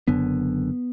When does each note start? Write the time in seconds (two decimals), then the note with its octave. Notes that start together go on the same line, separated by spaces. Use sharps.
0.08 F#1 F#2 D3 B3